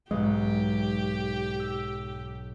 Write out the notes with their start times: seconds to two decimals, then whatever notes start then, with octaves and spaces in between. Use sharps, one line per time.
0.11 B1 G#2 G#3 G4
1.60 E6